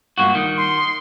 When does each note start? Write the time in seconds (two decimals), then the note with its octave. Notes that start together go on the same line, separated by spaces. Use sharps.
0.18 G2 A#2 F#4
0.35 D#3
0.57 C6